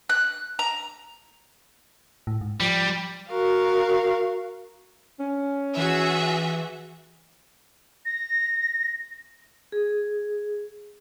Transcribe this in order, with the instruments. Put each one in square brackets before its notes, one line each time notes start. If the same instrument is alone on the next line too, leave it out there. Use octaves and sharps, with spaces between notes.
[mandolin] F#6
A#5
[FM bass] A2
G#2
[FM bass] F3 [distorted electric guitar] G3
[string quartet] F#4 A#4 F5
[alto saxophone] C#4
[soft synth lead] E3 [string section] F#4 G#4 E5
[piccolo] A#6
[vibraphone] G#4